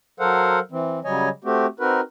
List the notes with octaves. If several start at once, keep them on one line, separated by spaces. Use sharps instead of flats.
F#3 A4 A#4 C5 F5 F#5
E3 C4
C#3 F#3 G3 C#5 D#5 G#5
A3 C4 F#4 G4
C4 D#4 F#4 A#4 B4